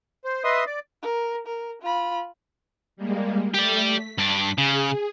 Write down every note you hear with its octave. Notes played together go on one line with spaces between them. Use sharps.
C5
B4 D#5 E5 C6 D#6
D5
A#4
A#4
F4 B5
G3 G#3 A#3
A3 G4 D5
B6
G2 D4 B6
C#3 G#4